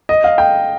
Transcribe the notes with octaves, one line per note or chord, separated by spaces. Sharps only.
D#5
F5
G5